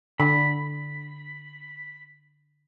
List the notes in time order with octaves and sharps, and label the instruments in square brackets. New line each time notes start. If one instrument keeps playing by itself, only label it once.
[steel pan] D3 [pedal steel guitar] B5